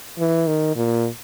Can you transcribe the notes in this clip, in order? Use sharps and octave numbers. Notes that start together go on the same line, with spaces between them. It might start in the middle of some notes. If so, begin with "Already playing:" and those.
E3
D#3
A#2